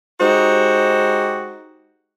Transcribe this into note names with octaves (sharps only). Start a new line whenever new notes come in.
G#3 D#4 F#4 G4 C5